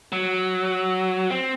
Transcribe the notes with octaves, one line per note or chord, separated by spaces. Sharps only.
F#3
C4